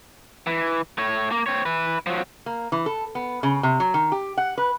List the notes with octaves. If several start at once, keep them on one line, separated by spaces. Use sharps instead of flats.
E3
A3 C#5
A#3
C4 C#5
E4 B4
F3 F#3
A#3
E3
A4
B3
C#3
C3
F#3
D#3
G4
F#5
B4